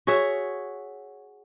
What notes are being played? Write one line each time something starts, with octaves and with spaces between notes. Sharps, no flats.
F#4 G#4 C#5 E5